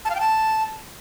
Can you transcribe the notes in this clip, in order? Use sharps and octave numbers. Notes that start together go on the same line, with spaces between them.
A5
F5
G5
A5